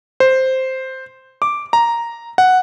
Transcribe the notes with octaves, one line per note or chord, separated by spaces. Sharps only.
C5
D6
A#5
F#5